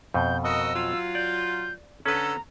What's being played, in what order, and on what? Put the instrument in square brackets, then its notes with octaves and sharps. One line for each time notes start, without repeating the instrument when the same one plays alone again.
[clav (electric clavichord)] F2 B2 [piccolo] G6
[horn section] F#4 A#4 D#5 [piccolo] E6
[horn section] F#3 F4
[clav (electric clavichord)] D5 [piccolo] G6
[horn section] D3 A4 [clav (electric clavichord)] C#4 B4 [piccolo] A#5